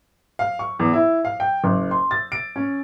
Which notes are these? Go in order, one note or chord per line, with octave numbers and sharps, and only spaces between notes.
F5
C#6
E2
E4
F5
G5
F#1
C6
A6
D7
C#4